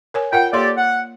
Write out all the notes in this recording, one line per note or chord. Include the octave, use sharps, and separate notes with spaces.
A#4 C#5 G#5
F4 A#4 F#5 G5
A#3 G4 A4 C#5 D5 C6
F#5